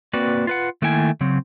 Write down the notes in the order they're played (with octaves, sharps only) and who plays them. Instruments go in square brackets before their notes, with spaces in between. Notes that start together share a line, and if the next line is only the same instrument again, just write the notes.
[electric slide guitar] A#3 C4 F#4 B4 D5
F4 B4 F#5
D#3 A3 A#3 E4 G5 G#5
C#3 F#3 C4